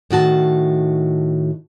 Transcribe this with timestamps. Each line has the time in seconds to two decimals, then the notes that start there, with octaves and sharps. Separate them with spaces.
0.11 A2 D#3 F#4 A5